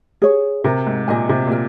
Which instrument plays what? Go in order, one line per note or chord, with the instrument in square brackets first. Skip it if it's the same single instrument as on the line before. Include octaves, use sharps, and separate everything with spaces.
[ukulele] G#4 C#5
[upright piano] C3 [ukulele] A#4
[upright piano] G#2
[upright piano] A#2 [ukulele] D#5 G#5
[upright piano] C3
A#2
[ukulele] A#4